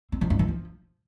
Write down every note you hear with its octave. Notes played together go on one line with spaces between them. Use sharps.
C4
F3
G2
E3
F3